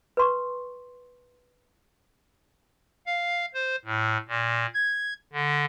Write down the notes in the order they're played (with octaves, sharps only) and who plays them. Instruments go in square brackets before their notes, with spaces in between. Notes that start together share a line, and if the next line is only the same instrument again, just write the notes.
[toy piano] B4 C6 C#6
[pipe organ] F5
C5
A2
A#2
G#6
D3